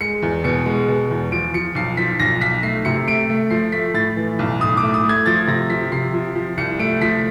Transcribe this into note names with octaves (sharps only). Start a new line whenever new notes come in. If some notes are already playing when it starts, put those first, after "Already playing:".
G#3 C#7
E2
B2 C#7
G#3
B2
E2
F3 D7
F3 C#7
B1 C7
F3 B6
B1 A#6
B1 B6
A3 C7
C3 C#7
A3 D7
A3
F3 C7
A3 B6
A2 A6
E3
B1
A2 D#6
D6
A3
D#6
A3
G#6
F3 A6
C3 A#6
F3 B6
C3 C7
F3
F3
C2 C#7
A3 D7
F3 B6